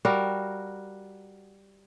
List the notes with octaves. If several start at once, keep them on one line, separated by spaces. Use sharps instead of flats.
G3 F#4 A#4 F5